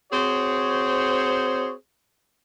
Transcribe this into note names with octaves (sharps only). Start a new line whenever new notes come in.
C4 F#4 G#4 C5 C#5